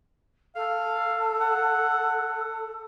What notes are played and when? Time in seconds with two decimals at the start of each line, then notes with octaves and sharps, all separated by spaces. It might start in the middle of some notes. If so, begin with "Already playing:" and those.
0.56 A4 F5
1.41 F#5